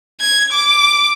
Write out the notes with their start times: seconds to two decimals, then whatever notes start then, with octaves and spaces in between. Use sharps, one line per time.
0.21 G#6
0.52 D6